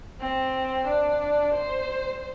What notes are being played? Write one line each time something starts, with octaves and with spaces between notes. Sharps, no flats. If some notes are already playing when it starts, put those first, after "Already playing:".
C4
D4
C5